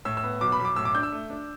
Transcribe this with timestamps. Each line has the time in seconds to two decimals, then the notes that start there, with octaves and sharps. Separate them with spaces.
0.05 A2 E6
0.17 E6
0.23 B3
0.41 B1 D6
0.52 B5
0.59 B1
0.65 D6
0.76 A2 E6
0.85 D6
0.94 D4 G6
1.03 E6
1.12 A3
1.30 D4